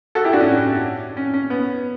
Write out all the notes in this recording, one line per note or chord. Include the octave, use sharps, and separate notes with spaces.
F#4 A4
E4 G4
D4 F#4
C#4 E4
C#4
C#4
B3